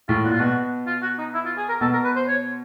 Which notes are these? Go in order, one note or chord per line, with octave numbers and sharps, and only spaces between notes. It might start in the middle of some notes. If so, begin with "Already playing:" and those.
A2 F4
A#2 F#4
F4
B2 F#4
F4
F#4
D#4
E4
F4
G#4
A#4
B2 A4
A#4
B4
C5
C#5